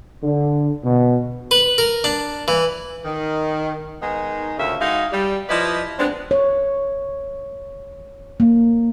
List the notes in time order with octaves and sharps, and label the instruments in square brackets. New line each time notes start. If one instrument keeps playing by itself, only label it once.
[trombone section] D3
B2
[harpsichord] B4
A#4
D4
E3
[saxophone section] D#3
D#3 G#3 B3 D#4
D2 A#2 C#3 F4 E5
G#3 D#4 E4 F#4 D#5 F5
G3
F3 E4 B4 D5 D#5
G#3 B3 C4 D4
[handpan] C#5
A#3